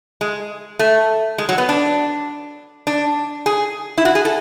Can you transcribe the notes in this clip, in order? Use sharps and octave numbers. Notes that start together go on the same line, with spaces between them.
G#3
A3
G#3
F#3
B3
D4
D4
G#4
E4
F#4
G#4
A4